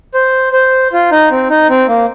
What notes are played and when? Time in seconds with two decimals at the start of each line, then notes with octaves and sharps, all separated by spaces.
0.14 C5
0.53 C5
0.93 F4
1.12 D#4
1.31 C4
1.50 D#4
1.69 C4
1.88 A#3